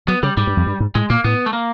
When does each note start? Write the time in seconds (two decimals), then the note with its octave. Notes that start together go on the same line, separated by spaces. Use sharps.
0.08 F#3 B3
0.23 C#3 G3
0.37 G#2 G3
0.47 G2
0.57 F2
0.67 G2
0.80 G#2
0.95 A2 G#3
1.10 A#2 A#3
1.24 A2 B3
1.46 A3
1.53 A#3